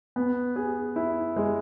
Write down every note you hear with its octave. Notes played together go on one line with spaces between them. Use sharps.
B3
G#4
E4
G#3